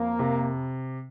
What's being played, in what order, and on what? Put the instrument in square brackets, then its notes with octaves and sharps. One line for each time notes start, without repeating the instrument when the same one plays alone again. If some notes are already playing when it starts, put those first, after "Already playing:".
Already playing: [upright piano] F2 [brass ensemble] A#3
[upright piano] C3